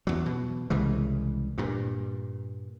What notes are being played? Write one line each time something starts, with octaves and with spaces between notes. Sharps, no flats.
E2 F#3
B2
C2 C#3 E3 G#3
G2 A#2